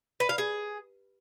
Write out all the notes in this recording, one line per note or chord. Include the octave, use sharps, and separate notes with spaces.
B4
F5
G#4